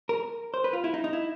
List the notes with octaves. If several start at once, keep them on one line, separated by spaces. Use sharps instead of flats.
A#4
C5
B4
F4
E4
D#4
D#4
E4